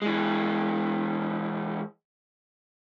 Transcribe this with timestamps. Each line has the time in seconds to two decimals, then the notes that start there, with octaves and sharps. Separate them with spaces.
0.02 E3 G#3